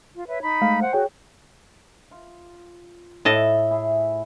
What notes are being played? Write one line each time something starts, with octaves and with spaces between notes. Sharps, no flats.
F4
B4 C#5 E5
D#4 B5
G#3 A3 F5
C5 F#5
F#4 G#4 C#5 G5
F4
A2 E4 D#5 E5 A5
E4 G#4 E5